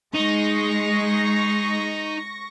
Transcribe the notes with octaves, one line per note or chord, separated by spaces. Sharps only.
G#3 D#4 C#6 A#6